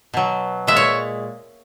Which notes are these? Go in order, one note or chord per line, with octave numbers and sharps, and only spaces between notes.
B2 F#3
A#2 G#3 E5
C#5